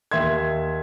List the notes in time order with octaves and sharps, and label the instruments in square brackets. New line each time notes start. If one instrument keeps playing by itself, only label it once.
[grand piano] D#2 E5 C6 G#6